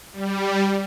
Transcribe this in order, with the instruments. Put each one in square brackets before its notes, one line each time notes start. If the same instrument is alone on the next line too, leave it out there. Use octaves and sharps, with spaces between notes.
[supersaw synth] G3